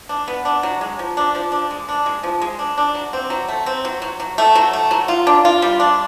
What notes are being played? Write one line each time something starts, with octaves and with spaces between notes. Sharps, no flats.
D4
B3
D4
F#3
G#3
F3
D4
F3
D4
G#3
D4
G#3
F3
G#3
D4
D4
F#3
C4
F#3
A3
C4
F#3
F#3
F#3
A3
F#3
A3
F#3
F4
D4
F4
G3
D4